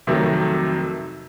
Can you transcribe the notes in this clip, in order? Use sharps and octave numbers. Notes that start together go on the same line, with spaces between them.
F2 C3 D#3 F#3 A3